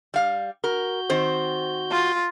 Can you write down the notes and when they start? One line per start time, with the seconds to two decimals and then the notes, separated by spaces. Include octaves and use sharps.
0.14 G3 F5
0.64 F#4 A#4 G6
1.10 D#3 C4 C5
1.91 F4